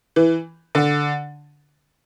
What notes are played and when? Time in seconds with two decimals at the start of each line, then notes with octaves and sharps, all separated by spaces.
0.16 E3
0.75 D3